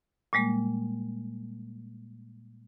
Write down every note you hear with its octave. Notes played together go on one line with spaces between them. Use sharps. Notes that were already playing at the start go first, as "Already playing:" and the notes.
A#2 G3 G#3 A#3